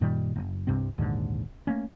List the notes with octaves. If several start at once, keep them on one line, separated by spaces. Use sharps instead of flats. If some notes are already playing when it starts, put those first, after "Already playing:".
F#2 A#2 D#3 G3
F#1
C2 G2 C3 C4
A#1 D#2 G#2 D3
A3 A#3 C#4